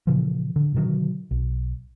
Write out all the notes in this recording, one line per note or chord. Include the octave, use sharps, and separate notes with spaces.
A#2 C#3 E3 F3
D3
B2 D3 D#3 F#3
B1